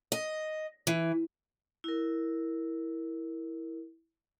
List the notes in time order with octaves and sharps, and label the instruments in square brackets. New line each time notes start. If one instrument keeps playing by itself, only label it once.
[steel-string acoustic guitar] D#5
E3
[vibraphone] E4 A#4